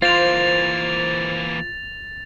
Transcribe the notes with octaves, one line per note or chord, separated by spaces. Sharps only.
E3 A#3 F4 C5 A6 F7